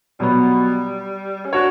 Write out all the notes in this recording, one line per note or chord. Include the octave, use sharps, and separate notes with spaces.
B2 F#3 G3 B3
C#4
D4 F#4 C#5